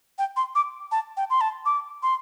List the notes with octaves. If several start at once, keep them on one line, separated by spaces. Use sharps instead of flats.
G5
C6
D6
A5
G5
C6
A5
D6
C6